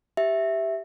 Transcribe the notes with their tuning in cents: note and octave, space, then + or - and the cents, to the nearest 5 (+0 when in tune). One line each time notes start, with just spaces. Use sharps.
G4 +0 E5 +0